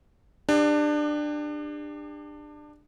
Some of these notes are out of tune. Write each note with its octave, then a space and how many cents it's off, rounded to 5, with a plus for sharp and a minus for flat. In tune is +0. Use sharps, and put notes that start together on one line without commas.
D4 +20 G4 +40